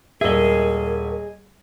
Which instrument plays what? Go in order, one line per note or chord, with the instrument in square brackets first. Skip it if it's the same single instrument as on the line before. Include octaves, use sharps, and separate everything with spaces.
[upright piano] D#1 E5 [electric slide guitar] G#4 D#5 [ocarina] A#4